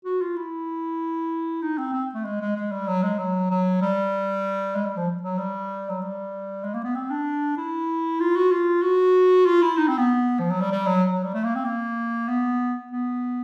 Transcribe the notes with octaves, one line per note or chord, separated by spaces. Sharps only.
F#4
F4
E4
D#4
C4
C4
A3
G#3
G#3
G#3
G3
F#3
G#3
F#3
F#3
G3
G#3
G3
F3
F#3
G3
F#3
G3
G#3
A#3
B3
C4
D4
E4
F4
F#4
F4
F#4
F4
E4
D#4
C4
B3
F3
F#3
G3
G3
F#3
F#3
G3
A3
A#3
C4
A#3
B3
B3